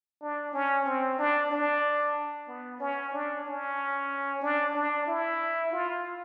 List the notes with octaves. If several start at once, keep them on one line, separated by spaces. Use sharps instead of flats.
D4
C#4
C4
D4
D4
B3
C#4
D4
C#4
D4
D4
E4
F4